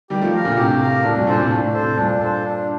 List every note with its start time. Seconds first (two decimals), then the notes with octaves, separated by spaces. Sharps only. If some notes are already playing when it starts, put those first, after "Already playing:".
0.10 D#3 G3 G4
0.21 F3 A3
0.33 A#4 F5
0.45 A#2 D3
0.57 A2 C3 G4
0.81 A#4 F5
1.04 A2 C3 D4
1.15 G2 A#2
1.27 G2 A#2 A4 C5
1.39 A2 C3
1.47 A#2
1.50 A2 D4
1.66 A2
1.74 A4 C5
1.81 A2 C3
1.97 G2 A#2 D4
2.20 A4 C5
2.44 D4